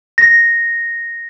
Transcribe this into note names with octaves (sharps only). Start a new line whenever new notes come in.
A#6